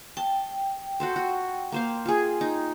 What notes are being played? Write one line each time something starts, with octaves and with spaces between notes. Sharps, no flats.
G5 A5
F#4 A4 C5
F#4
A#3 C5 F5
F4 G#4
D#4